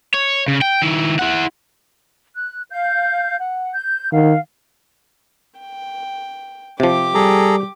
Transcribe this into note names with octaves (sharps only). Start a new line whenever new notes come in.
C#5
C#3
G5
D#3 E4
E4 F#5
F#6
F5 G6
F#5
G6
D#3 F5 F#5
G5
C3 F3 G4 D6
G3 G#4 A4 A#5